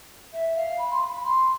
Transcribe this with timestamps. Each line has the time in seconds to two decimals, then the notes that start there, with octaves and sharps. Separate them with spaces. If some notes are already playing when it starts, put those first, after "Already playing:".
0.33 E5
0.56 F5
0.78 B5
0.91 C6
1.01 B5
1.13 B5
1.24 C6